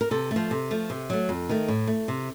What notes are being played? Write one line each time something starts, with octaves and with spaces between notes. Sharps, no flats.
A#4
C3 A4
A3
F3
C3
F3 A3
C3
F#3 A3
F2
D#3 A3
A2
A3
C3